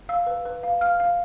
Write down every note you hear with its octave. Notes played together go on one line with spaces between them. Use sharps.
F5 E6
B4
B4
F5
F5 F6
F5